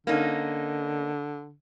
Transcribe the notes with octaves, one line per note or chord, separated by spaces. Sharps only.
D3 A#3 C#4 D#4